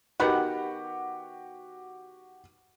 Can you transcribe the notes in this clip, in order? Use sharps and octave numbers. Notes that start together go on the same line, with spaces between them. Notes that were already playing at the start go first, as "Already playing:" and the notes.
D#3 B3 F#4 G4 F#5